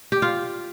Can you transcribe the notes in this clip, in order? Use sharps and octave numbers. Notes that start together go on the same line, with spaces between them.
G4
F4